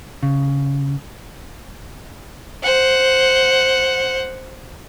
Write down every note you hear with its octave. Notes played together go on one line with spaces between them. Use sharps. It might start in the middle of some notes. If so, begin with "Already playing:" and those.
C#3
C5 F#5